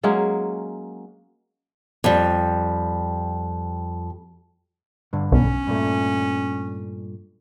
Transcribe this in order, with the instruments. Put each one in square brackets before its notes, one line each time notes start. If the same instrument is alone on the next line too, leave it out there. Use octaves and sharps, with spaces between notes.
[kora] F#3 G#3 A#3 C#4
[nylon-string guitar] F2 G3
[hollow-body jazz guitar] G2 D3
[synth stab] B1 [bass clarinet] C#4
[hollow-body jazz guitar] G2 A#2 A3